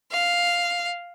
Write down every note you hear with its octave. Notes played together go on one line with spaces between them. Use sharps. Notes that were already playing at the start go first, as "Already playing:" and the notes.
F5